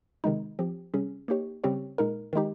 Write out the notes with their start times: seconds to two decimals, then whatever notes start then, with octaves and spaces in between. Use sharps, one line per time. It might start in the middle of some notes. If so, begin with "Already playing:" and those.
0.24 C3 D#3 G#3 D#4
0.59 F3 C4 G4
0.94 C3 G3 C#4 G#4
1.28 A#3 D#4 G4 C#5
1.64 C#3 G3 C4 G4 C#5
1.98 A#2 G#3 D#4 A#4
2.33 D#3 G#3 D#4 G4